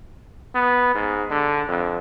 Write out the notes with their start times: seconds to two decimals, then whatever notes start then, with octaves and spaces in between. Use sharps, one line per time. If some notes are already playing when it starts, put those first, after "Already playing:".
0.55 B3
0.95 G#2
1.31 D3
1.68 F2